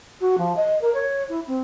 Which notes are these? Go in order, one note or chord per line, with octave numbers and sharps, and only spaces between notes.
F#4
F3
D#5
A#4
C#5
E4
C4